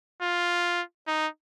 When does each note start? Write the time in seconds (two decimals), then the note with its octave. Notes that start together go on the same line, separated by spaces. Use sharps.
0.22 F4
1.07 D#4